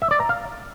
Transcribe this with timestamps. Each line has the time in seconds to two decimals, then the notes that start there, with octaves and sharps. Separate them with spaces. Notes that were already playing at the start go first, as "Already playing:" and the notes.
0.02 E5
0.11 D5
0.20 A#5
0.29 F5